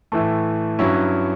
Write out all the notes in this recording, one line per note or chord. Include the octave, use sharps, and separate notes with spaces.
A2 E3 A3
G2 F#3 C#4 E4